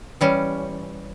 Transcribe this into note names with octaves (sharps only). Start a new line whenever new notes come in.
E3 G3 C#4